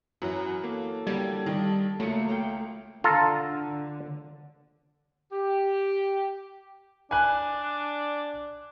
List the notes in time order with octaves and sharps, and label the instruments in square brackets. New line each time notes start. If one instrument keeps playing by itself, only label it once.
[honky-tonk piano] F#2 [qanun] E3 F#3 F#4
[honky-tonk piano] A#3 [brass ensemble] A4
[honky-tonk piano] D3 A#3 G#6 [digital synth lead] G3
[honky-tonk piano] D#3 G4 [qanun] D5 D#5 F5
[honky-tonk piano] C#2 C#7 [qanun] F#3 A#3 [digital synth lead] A3
[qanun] C#5 F5 G5
[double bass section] D3 [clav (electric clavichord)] F4 A4 A#5
[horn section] G4
[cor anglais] D4 [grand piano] G#5 F#6